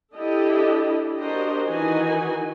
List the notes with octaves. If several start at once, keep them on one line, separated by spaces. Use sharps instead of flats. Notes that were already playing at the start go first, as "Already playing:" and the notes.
D4 E4 G4 A4 D#5
D4 F#4 G4 A#4 C5 D#5
D#3 E3 D#4 F#4 G#5